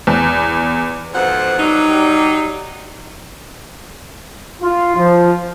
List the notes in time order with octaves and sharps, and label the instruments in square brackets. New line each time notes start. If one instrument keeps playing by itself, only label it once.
[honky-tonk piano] E2
[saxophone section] F2 G#2 B2 F3 C5 F#5
F#3 G3 D#4
[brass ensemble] F4
F3